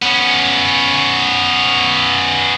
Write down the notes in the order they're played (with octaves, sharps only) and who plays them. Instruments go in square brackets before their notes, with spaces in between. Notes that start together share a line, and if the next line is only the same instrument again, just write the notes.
[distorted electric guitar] B3 C#4